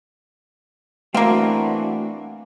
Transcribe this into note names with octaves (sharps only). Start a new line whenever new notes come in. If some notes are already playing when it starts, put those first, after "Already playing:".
E3 A3 A#3 C4 D4 F#4 F5